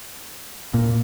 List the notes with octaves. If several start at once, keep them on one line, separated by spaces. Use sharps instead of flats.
A#2